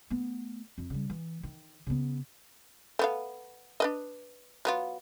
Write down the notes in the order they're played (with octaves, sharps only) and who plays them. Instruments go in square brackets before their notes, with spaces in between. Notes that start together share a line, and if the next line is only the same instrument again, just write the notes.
[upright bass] A3 B3
F2
C#3 G3
E3
D#3
C#3 B3
[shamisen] A3 B3 F5
D4 B4 D#5
F#3 B3 F4